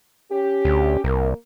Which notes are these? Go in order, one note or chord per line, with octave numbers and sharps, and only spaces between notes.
C#4 G4
D2
C2 A#3 A#4